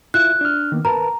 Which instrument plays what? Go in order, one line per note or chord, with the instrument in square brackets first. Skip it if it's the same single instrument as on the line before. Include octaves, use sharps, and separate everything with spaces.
[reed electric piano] E4 F4 E5 [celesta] F#6
[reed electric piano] D4 F6
D#3 A#3 B3
[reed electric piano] A#4 B4 A5 [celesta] A#5